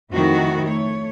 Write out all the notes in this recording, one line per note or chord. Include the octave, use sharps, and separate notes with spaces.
F2 D#3 A3 E4 F#4
A3 C#5